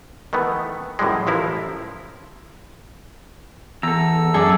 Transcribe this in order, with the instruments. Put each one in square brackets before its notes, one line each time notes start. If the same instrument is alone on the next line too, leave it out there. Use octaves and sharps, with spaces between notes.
[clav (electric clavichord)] D#3 E3 A3 B3
F#2 A2 E3 G3 G#3
A1 F3 E4 A#4
[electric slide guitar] E2 [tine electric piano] A4 A#5 [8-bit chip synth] E6
[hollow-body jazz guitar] F#2 G#4 [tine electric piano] A4 D5